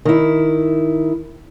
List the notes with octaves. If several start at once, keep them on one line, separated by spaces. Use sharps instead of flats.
D#3 E4